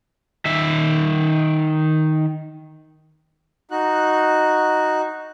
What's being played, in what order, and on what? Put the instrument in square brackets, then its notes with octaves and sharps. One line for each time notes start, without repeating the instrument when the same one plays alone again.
[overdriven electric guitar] D#3 E5
[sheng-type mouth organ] D#4 F#4 F#6